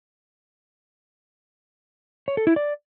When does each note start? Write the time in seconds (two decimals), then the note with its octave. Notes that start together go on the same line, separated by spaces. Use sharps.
2.28 C#5
2.37 A4
2.47 E4
2.56 D5